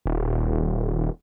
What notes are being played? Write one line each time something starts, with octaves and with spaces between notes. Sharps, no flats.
D#1